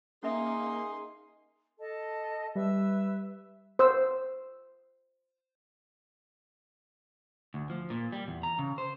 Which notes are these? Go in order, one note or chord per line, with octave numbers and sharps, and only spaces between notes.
A#3 C#4 D#4 G#4 E5 C6 D#6
A4 D#5 A5
G3 B4 E5 E6
C5 E6
D2
F3
A#2
G3
E2
A#5
C#3
C5